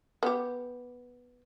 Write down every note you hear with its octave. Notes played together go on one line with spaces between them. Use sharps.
B3 G4